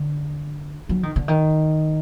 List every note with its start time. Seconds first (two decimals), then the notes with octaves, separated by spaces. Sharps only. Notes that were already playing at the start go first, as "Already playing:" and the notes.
Already playing: D3
0.89 F#3
1.03 D#3
1.16 D3
1.28 D#3